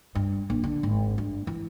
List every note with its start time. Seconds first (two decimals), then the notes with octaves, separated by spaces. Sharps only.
0.15 G2
0.50 A#1
0.64 D3
0.83 G#1
1.18 G2
1.47 E3